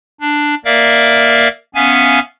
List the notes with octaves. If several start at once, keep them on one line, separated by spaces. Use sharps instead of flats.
D4
A#3 A#4 D5 E5 F5
B3 C#4 E5 F5 G#5